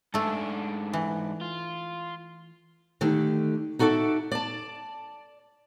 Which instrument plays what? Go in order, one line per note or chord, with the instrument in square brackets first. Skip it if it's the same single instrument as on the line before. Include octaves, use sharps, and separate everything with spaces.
[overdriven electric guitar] G#2 D4 [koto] A3 A4
[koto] E3
[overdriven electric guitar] F4
[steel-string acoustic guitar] D3 D#3 A3 G4
D#4 F#4 A4 D5 E5
D5 A5